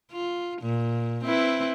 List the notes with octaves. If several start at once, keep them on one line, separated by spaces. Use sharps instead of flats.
F4
A#2
C4 E4 B4